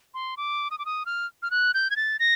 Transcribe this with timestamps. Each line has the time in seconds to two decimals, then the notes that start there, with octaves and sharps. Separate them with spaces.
0.14 C6
0.37 D6
0.71 D#6
0.79 D6
0.86 D#6
1.06 F6
1.43 F6
1.51 F#6
1.74 G6
1.91 G#6
1.96 A6
2.19 A#6